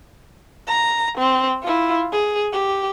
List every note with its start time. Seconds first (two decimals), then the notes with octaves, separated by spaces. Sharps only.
0.67 A#5
1.18 C4
1.62 E4 F4
2.12 G#4
2.53 G4